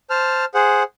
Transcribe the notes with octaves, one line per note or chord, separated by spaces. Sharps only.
C5 A5 F6
G#4 C5 F#5